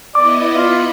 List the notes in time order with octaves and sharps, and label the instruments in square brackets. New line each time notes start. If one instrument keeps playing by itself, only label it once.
[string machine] B3 E4 D#5 [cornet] D5 [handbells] D6
[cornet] F4 [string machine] B5 C#7